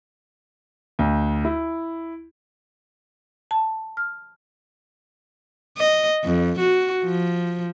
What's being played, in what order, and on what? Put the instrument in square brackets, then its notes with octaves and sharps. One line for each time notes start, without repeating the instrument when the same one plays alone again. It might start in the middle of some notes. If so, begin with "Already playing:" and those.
[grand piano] D2
E4
[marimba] A5
F6
[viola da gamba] D#5
F2
F#4
F3